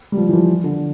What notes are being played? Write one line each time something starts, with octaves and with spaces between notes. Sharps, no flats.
G3
F3
E3
F3
D3